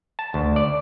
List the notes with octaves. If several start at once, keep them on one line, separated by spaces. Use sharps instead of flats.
A5
D2
D5